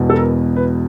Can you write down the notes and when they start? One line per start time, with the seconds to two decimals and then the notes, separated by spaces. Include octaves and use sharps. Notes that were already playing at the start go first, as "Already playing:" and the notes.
Already playing: E1 E2 B2
0.10 A4
0.16 A#4
0.56 B4